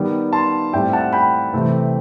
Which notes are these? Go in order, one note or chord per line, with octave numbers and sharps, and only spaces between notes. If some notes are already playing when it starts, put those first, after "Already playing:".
Already playing: D#3 G3 B3
A5 C6
A2 G3 C4 E5 G5
F#5 A5
G5 B5
C3 E3 A3 C4